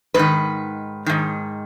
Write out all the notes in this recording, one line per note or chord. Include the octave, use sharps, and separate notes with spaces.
G#2 D#3 B4
G#2 D#3